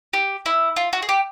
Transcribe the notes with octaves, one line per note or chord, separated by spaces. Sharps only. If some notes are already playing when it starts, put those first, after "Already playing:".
G4
E4
F4
F#4
G#4
G4